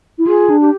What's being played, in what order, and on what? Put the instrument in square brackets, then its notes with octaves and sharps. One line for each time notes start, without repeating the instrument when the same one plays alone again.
[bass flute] E4
[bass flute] F4 [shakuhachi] G#4
[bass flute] D4
[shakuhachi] G4